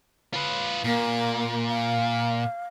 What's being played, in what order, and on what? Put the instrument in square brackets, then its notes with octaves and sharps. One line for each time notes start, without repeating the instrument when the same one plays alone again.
[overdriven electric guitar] F4 B4
[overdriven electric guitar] A#2 [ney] A#3
[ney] F5